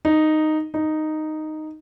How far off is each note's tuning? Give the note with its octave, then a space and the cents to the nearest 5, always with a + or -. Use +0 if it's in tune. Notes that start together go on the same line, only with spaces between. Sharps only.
D#4 -5
D#4 -5